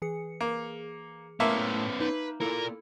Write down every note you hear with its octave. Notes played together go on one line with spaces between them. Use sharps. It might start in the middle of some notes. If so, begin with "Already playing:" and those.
E3 G#4 C#7
A#3
A2 A#3 B3 C#4 E5 A5 C6 F6
D#4 B4
A#3 E4 F4 A4 A#4